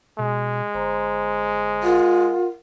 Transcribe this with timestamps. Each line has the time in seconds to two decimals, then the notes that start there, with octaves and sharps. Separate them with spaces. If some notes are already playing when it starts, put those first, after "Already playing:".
0.19 B2 G#3
0.74 G1 C5 A#5 C6
1.83 F4 A#4 F#5